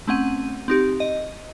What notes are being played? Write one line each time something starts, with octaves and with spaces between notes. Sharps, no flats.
A3 C4 C#4 F#5 D#7
C4 D#4 G4
D#5